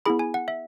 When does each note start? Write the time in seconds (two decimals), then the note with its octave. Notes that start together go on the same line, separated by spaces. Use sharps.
0.06 B3 E4 G#4 B5
0.19 G#5
0.34 F#5
0.48 E5